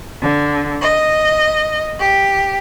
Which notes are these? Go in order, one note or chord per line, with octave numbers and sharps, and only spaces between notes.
D3
D#5
G4